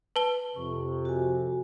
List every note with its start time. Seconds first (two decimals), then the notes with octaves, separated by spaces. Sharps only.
0.16 B4 A5 G7
0.56 F2 C3 C#6
1.05 F#4 G#5